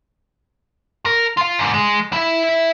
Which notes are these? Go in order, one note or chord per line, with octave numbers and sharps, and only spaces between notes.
A#4
F4 F5
G#2 D3
G#3
E4 E5